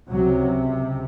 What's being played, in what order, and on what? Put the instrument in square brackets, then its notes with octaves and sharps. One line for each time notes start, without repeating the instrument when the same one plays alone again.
[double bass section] C#2 C3 F#3